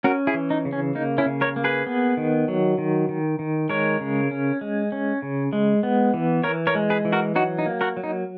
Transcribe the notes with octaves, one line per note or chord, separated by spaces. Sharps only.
C#4 F#4 A#4
E4 G#4
E3
D#4
C#3
C#4
A#3 D#4
C#4 E4
C#3
A#4 C#5
A#3
G#4 B4
B3
D#3
F#3
D#3
D#3
D#3
G#3 A#4 C#5
C#3
C#4
G#3
C#4
C#3
G#3
B3
E3
E3 A#4 C#5
A#4 C#5
G#3
G#4 B4
E3
F#4 A#4
F#3 D#4 F#4
D#4
A#3
F#4 A#4
F#3
D#4